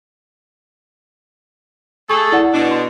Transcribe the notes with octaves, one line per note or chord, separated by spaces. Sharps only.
A3 G#4 A4 C#6
E4 D5 F#5
B2 D4
C6